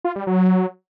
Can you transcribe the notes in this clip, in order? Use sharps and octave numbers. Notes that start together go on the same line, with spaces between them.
F4
G3
F#3